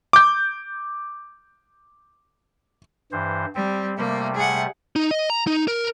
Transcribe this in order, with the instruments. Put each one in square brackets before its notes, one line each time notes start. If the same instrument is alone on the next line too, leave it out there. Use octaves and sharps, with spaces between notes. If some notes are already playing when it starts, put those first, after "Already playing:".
[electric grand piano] D6 G6
[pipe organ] G2 E3 C5
[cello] G3 [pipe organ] C4
[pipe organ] C3 G3 A3 [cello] A#3
[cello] G#4 F#5
[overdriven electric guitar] D#4
D#5
A#5
D#4
A#4